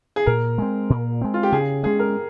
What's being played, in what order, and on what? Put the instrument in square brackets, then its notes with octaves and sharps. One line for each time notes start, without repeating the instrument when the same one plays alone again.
[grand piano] G#4
[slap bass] A#2 [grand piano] A#4
[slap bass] G#3 C4
A#2
G#3 C4
[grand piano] F4
G4
[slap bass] C#3 [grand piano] G#4
[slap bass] G#3 C#4 [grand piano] G#4
[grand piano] A#4